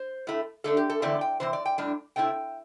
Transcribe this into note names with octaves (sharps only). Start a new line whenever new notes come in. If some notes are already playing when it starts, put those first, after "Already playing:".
Already playing: C5
A2 A3 E4
D3 A3 D4 A4
G4
A4
E2 D3 A3 C4 E4 D5
G5
C3 E3 C4 C5
D5
G5
A2 G3 D4
C3 A3 C4 E4 G5